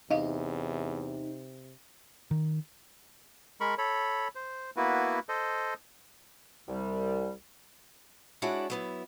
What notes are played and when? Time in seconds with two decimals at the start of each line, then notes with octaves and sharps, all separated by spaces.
0.11 E2 C3 D#4 D#5 F5
2.31 D#3
3.60 G#3 A#4 B5 C#6
3.78 A4 C#5 B5
4.35 C5
4.76 A#3 B3 E4 F#4 B4
5.29 A4 C5 D#5
6.68 C2 G3
8.42 G#3 D4 E4 F#4 C#5 D5
8.70 F#3 B3 E4